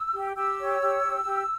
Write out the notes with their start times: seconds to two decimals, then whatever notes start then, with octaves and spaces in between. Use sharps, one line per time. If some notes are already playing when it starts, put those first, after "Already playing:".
Already playing: E6
0.14 G4
0.36 G4 E6
0.59 C#5
0.81 G4
1.03 G4
1.25 G4